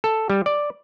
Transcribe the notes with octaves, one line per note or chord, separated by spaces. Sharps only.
A4
G3
D5